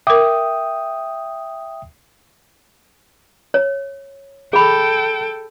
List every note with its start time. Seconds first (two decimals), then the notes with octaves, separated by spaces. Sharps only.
0.07 A#4 E5 G5 D6 D#6
3.54 C#5
4.53 G#4 A4 G5 B5